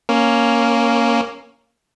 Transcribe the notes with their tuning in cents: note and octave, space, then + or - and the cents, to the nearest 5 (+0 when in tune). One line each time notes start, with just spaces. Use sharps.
A#3 +0 C#4 +0